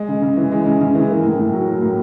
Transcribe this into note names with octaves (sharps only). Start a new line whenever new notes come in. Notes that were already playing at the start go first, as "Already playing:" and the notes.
Already playing: G#3
C#3
C#3
E3
G#3
C#3
C#3
E3
A#3
A2
A2
F#3
A#3
A2